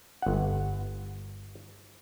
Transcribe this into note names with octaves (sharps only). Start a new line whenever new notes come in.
G1 F#5